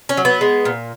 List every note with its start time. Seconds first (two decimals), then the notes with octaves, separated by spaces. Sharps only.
0.09 C#4
0.17 F#3
0.25 B3
0.41 G#3
0.65 A#2